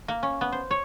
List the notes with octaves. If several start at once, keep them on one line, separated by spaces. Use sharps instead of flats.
A#3
C#4
B3
C5
C#5